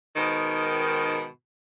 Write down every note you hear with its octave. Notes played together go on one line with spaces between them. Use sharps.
G#2 B2 D#3